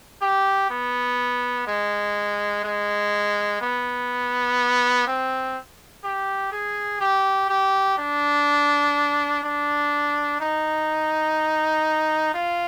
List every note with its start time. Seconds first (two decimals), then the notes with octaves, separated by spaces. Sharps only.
0.22 G4
0.70 B3
1.67 G#3
2.64 G#3
3.61 B3
5.07 C4
6.04 G4
6.52 G#4
7.00 G4
7.49 G4
7.98 D4
9.43 D4
10.40 D#4
12.34 F4